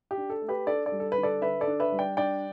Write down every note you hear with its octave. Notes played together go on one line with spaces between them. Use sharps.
G4
D4
A4
A3
G4 B4
D4 A4 D5
A4 D5
G3
A4
B4
D3
A4 D5
D3 B4 E5
A4 D5
D4
B4 E5
G3
D5 G5
D4 D5 G5